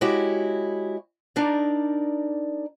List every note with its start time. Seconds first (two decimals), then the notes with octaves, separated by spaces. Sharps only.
0.01 G#3 E4 F#4 G4 C#5
1.36 D4 D#4 A#4 D5